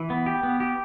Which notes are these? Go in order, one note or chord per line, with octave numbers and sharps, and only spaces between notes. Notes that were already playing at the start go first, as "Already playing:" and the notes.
Already playing: E3
B3
G4
B3
G4